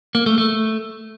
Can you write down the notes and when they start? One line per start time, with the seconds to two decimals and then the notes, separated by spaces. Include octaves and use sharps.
0.15 A#3
0.26 A3
0.38 A3